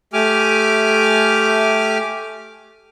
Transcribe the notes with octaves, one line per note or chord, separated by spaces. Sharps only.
A3 G4 G#5 D6 F6